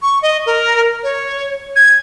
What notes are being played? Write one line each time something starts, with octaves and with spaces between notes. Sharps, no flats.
C#6
D#5
A#4
C#5
G#6